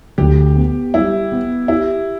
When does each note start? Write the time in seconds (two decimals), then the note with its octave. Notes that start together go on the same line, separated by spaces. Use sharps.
0.18 D2 G4
0.56 B3
0.94 G3 E4
1.32 B3
1.68 E4 G4